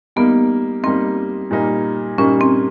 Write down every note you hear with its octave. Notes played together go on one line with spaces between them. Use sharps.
G3 A#3 B3 D#4
G3 A#3 C4 D#4
A#2 G3 A#3 D#4
A#2 G3 A#3 C#4 D#4
C4